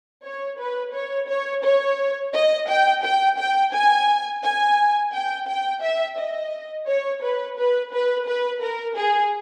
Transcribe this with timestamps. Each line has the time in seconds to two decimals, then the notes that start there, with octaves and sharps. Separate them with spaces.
0.24 C#5
0.58 B4
0.93 C#5
1.28 C#5
1.64 C#5
2.33 D#5
2.68 G5
3.03 G5
3.38 G5
3.73 G#5
4.43 G#5
5.13 G5
5.48 G5
5.82 E5
6.18 D#5
6.87 C#5
7.23 B4
7.58 B4
7.93 B4
8.27 B4
8.62 A#4
8.97 G#4